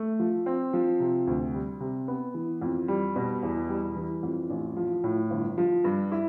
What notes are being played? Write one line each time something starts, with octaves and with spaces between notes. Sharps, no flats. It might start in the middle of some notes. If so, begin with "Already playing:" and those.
Already playing: A3
F3
C4
F3
C3
D2
G3
C3
B3
E3
F2
G3
B2
E2
G3
E3
F2
A1
F3
A2
G1
F3
G2
E4